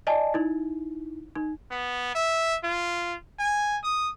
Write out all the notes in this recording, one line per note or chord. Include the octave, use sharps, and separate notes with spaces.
D5 D#5 G#5 A5
D#4 E4
D#4
B3
E5
F4
G#5
D#6